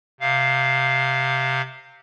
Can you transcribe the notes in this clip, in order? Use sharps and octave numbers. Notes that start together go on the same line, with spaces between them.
C3 F5